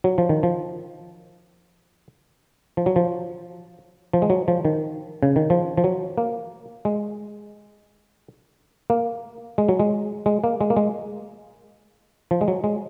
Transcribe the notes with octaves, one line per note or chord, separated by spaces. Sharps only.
F#3
F3
D#3
F3
F3
F#3
F3
F3
G#3
F#3
F3
D#3
C#3
D#3
F3
F3
F#3
A#3
G#3
A#3
G#3
F#3
G#3
G#3
A#3
G#3
A#3
G#3
F3
G#3
F#3
G#3